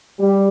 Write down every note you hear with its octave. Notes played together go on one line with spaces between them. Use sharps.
G3